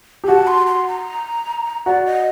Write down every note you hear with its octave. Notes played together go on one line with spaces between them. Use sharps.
G4
F#4 A5
C6
C6
A#5
F#4 D5
D#5